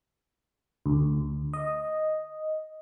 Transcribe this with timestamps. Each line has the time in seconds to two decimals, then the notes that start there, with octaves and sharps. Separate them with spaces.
0.86 D2
1.53 D#5